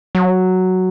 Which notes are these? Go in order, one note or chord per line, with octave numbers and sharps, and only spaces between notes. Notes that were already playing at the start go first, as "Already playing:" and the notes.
F#3